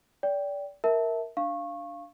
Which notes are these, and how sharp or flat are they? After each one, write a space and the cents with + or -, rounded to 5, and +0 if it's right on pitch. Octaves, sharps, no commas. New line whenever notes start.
D5 -30 G5 +0
A#4 +0 E5 -20 A5 +0
D4 +0 F5 -10 C#6 -20